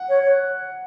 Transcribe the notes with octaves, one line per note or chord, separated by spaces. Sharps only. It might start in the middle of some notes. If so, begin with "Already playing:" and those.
Already playing: F#5
C#5
C#5